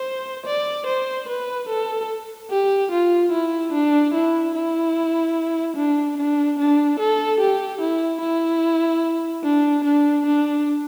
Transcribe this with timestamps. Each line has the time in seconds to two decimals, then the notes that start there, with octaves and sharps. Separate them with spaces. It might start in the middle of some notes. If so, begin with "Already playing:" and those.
Already playing: C5
0.46 D5
0.86 C5
1.28 B4
1.69 A4
2.50 G4
2.91 F4
3.31 E4
3.72 D4
4.14 E4
4.55 E4
5.76 D4
6.17 D4
6.58 D4
6.99 A4
7.39 G4
7.81 E4
8.21 E4
9.44 D4
9.84 D4
10.26 D4